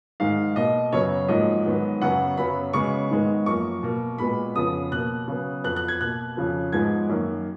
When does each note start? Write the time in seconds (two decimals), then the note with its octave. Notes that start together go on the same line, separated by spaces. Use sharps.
0.20 G#2 D#3 G#3 F5
0.56 B2 A#3 D#5
0.92 F#2 C#3 F#3 B3 C#5
1.28 G#2 F3 A#3 D#5
1.65 G#2 D#3 F#3 B3
2.01 F#2 C#3 F#3 B3 F#5
2.37 F#2 C#3 F#3 B3 B5
2.73 C#3 G#3 B3 C#6
3.10 G#2 D#3 G#3 B3
3.46 F#2 F3 A#3 C#6
3.83 B2 A#3
4.18 A#2 G#3 B3 B5
4.56 F2 C#3 F3 B3 D#6
4.92 B2 A#3 F#6
5.28 C#3 F#3 B3
5.64 F2 F3 B3 F#6
5.76 F#6
5.88 G#6
6.01 B2 A#3 F#6
6.37 F2 C#3 F3
6.72 G#2 F3 G#3 B3 G#6
7.09 F#2 D#3 A#3